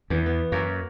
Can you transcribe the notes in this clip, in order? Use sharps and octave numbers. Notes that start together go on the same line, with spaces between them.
E2 E3
B3
F#2 A#3 F#4 A#4